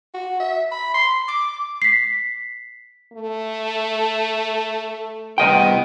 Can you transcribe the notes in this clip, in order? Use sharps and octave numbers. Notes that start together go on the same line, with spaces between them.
F#4
E5
B5
C6
D6
B6 C7
A3
C2 B3 D#5 G5